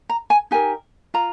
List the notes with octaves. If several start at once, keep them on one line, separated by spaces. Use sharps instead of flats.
A#5
G#5
D#4 G4 A#4 G#5
F4 A#5